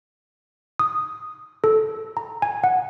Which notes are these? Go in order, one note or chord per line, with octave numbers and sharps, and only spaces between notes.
D#6
A4
A#5
G#5
F#5